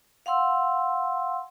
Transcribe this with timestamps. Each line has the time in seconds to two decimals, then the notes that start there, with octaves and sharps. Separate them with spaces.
0.26 F5 F#5 C6 E6